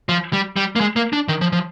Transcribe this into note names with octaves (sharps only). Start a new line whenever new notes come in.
F3
G3
G3
A#3
G#3
A#3
D4
D#3
F3
F3